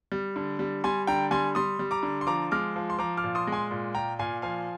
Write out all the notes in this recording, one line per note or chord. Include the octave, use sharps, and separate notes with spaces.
G3
D3
G3
G3 G#5 C6
D3 G5 A#5
G3 G#5 C6
G3 C6 D#6
G3
A#5 D6
D3
C6
F3 A#5 D6
G#3 D6 F6
F3
C6
F3 A#5 D6
D6 F6
A#2
C6 D#6
G#3
G#5 C6
A#2
A#2 G5 A#5
A#2 F5 G#5
F3 F5 G#5